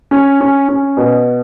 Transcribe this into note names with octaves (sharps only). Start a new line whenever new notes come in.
C#4
C#4
C#4
B2